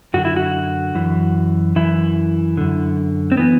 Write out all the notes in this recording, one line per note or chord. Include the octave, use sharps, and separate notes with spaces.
F#2 D3 F#4
E4
F#4
F#2 E3
F#2 E3 E4
F#2 D3
C4
E3 B3